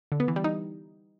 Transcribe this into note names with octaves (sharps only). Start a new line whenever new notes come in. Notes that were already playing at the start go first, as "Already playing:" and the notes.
D3
B3
E3
G3
D#4